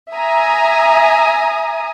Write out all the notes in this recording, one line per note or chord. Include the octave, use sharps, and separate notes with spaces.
E5 G#5 A#5 D#6